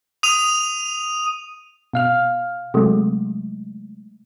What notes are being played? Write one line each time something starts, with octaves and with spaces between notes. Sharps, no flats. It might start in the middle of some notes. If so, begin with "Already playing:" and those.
D#6 D#7 F7
B2 F5 F6
C3 F#3 G#3 A3